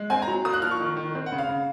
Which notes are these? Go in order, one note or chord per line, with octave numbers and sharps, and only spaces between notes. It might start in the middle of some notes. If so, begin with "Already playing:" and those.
Already playing: G#3
C4 G#5
A#5
F#3
A#3 D#6
F#6
F3 F6
C#6
D#3
D#3
C4
F#5
C#3
F5
C#3